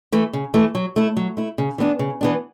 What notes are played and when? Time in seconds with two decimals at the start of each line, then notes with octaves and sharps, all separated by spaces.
0.12 E3 A3
0.33 C#3
0.54 E3 A3
0.75 F#3
0.96 A3 E4
1.17 F#3
1.37 A3 E4
1.58 C#3
1.78 E3 B3 D4
1.99 C#3
2.21 E3 B3 D4